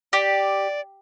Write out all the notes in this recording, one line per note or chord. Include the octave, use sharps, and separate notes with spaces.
G4 D5